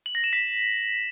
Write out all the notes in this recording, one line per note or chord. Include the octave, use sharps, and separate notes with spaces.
F#7
A#6
E7
B6